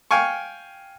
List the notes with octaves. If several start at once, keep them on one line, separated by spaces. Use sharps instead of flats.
F5 G5 G#5 C#6